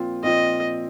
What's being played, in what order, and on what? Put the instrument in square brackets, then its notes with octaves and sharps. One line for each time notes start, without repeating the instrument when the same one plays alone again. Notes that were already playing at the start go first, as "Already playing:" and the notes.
Already playing: [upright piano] A#2 F3 C4 F4
[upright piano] A#2 F3 C4 F4 [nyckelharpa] D#5